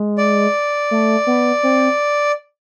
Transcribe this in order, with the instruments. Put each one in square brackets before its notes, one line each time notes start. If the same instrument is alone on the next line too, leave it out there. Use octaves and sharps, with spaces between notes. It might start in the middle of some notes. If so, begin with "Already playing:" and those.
Already playing: [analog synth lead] G#3
[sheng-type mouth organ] D5
[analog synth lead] A3
B3
C4